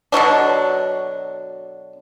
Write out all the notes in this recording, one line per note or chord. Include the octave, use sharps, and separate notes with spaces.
B2 D3 F#3 D4